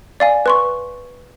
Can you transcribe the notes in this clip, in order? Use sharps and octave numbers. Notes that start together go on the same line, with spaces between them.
D5 F5 G#5
B4 C6 C#6